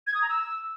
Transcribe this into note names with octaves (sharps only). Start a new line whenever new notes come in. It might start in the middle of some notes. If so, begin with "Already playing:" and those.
G#6
D#6
A#5
E6